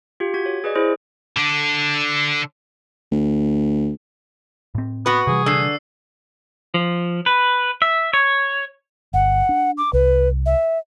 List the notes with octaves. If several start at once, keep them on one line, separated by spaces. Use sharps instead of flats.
F4 G4
F#4 G#6
C#5
G#4 B4 D5 D#5
E4 G#4 C5
D3 D4
D2
A2 C4
B3 F#4 B4
C3 E3 G3 G#4
D3 E6 C7
F3
B4
E5
C#5
G1 F#5
D4
D6
C2 B4
E5